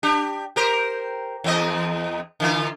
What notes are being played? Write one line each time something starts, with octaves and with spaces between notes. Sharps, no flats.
D4 G4
G4 A#4 C5
E2 C4 D#5
D3 E3 F4